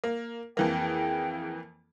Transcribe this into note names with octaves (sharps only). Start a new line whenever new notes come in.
A#3
F2 E3 A#3 G#4 G5